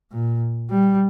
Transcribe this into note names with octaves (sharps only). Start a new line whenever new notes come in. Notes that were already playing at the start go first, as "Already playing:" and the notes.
A#2
G3